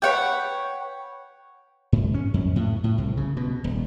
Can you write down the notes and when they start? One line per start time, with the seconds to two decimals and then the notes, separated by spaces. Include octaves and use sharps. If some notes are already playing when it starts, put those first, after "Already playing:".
0.02 B4 C#5 F#5 G5
1.92 G#2
2.14 C#4
2.34 F2
2.56 A2
2.84 A2
2.98 C2
3.17 C#3
3.37 B2
3.64 D#1